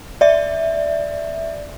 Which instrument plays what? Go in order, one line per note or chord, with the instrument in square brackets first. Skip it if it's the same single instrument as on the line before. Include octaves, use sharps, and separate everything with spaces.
[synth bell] D5 E5